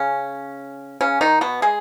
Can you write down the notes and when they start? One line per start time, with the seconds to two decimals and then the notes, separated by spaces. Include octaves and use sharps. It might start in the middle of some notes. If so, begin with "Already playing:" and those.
Already playing: C#3 C#4
1.01 C#3 C#4
1.21 D#3 D#4
1.41 B2 B3
1.62 G#3 G#4